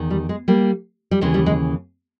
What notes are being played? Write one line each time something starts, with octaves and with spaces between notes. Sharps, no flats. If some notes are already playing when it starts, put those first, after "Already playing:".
Already playing: E2 D#3
G3
G#3
G3 A#3
G3
D#2 C#3 E3 G#3
G3
G#3